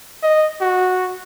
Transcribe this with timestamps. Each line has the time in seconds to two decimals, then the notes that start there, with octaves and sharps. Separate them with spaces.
0.23 D#5
0.61 F#4